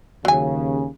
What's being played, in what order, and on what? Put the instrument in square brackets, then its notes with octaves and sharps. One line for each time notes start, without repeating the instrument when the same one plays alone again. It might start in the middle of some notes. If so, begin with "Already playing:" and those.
[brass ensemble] D#2 C#3 [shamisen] F#3 G#5